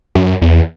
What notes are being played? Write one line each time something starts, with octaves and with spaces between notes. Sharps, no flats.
F#2
E2